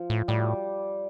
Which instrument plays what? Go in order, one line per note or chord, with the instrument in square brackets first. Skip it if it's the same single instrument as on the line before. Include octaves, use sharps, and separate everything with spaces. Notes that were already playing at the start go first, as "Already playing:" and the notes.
Already playing: [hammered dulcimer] F3
[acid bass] A2
[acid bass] A2 [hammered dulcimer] G3